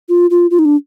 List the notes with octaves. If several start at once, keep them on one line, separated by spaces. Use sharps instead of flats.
F4
F4
F4
D#4
D4